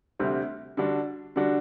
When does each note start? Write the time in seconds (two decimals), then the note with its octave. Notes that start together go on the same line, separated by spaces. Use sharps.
0.19 D2 C3 G3 C4
0.77 D3 G3 D4 F#4
1.36 D3 G3 D4 F#4